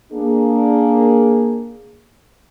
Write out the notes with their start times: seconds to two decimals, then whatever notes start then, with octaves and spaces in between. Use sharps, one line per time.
0.12 A#3 D4 G#4